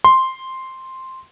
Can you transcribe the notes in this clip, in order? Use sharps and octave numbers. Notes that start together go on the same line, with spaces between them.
C6